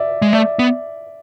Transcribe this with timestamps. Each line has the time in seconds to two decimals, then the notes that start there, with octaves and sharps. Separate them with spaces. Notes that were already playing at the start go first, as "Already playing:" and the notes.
Already playing: D5 E5
0.22 G#3
0.32 A3 D5 E5
0.59 B3